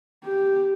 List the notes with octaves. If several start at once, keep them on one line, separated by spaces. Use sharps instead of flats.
G4